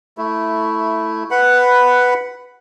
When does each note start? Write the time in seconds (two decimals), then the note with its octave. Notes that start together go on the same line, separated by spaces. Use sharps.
0.18 A3 E4
1.31 B4 F#5 B5